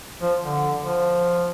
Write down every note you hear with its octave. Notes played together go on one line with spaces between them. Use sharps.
F3
D3
F3